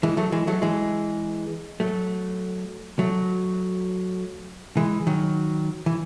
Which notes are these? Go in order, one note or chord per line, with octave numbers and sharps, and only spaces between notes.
E3 G#3
F#3 A3
E3 G#3
F#3 A3
E3 G#3
F#3 A3
F#3 A3
E3 G#3
D#3 F#3
E3